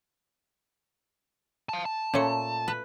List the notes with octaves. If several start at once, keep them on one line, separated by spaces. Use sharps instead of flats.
F5 A5
A5
A#2 A3 C#4 C#5 C#7
B4